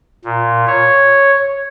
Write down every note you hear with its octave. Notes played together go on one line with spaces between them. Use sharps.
A#2
C#5